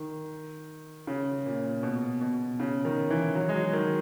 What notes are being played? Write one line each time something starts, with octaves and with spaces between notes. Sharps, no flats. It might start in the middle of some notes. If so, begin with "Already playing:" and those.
Already playing: D#3
C#3
A#2
B2
B2
C#3
D#3
E3
F#3
G#3
F#3
D#3